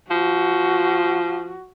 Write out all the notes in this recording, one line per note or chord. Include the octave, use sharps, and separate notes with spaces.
F3 F#4